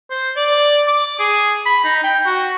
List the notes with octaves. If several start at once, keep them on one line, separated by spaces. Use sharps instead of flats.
C5
D5
D6
G#4
B5
D#4
G5
F#4